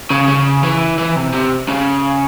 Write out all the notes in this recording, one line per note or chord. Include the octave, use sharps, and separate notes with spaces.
C#3
C#3
E3
E3
C3
C3
C#3